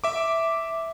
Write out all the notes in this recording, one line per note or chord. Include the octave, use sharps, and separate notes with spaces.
E5 D6